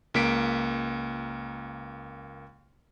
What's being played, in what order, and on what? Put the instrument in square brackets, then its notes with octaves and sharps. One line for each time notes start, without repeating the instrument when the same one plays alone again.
[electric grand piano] C#2 A#3 B6 D7